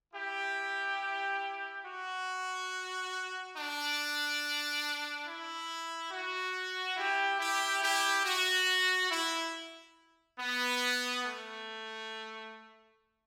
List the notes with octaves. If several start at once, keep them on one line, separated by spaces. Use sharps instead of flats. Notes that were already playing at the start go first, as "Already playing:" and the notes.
E4 G4
F#4
D4
E4
F#4
E4 G4
E4 G4
E4 G4
F#4
E4
B3
A3